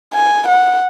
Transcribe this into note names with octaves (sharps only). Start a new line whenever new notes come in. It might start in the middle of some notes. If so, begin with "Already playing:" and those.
G#5
F#5